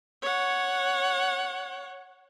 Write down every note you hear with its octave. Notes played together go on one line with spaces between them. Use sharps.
C#5 F#5